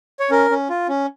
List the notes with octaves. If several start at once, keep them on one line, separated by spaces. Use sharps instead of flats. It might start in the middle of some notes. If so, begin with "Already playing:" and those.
C#5
C#4 A#4
C#4
F4
C#4